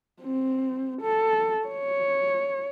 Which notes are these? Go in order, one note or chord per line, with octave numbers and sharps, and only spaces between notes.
C4
A4
C#5